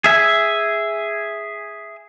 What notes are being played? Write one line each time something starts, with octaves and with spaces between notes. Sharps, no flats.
G#4 E5 G#5